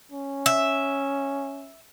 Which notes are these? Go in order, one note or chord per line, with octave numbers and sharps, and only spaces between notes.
C#4
E5